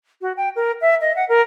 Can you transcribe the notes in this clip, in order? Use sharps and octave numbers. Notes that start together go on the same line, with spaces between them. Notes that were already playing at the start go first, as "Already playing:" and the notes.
F#4
G5
A#4
E5
D#5
F#5
A#4